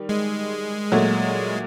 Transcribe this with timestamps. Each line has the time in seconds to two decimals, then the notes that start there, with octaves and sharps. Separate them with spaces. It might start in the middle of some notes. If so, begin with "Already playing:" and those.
Already playing: D#3 G3
0.09 G#3
0.92 A#2 F#3 A3